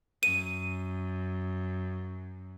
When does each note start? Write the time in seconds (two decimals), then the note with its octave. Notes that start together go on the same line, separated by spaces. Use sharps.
0.23 F#2 D#7